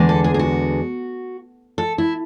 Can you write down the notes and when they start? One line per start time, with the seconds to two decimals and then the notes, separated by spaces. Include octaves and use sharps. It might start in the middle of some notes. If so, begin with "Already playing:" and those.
Already playing: E2 D3 G#3
0.09 A4
0.24 G#4
0.34 G#4
0.39 F#4
1.78 A4
1.98 E4